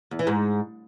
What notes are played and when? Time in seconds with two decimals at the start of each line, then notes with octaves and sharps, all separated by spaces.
0.11 E2
0.19 E3
0.27 G#2